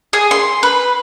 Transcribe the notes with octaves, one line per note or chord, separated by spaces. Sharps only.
G#4
C6
B4